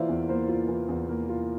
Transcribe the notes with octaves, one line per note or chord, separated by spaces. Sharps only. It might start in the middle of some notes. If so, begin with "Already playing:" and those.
Already playing: E3 A#3 F4 C5 D5 E5 F5
E2
A#3 C5
F4
E3
E2
A#3
F4